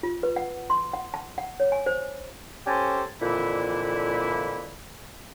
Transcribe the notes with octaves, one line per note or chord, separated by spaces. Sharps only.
F4
B4
F#5
C6
F#5
A5
F#5
C#5
G#5
C5
C#4 G4 A4 C5 G#5 A5
F2 A#2 D3 E3 E4